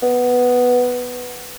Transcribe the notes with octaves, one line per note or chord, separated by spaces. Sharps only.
B3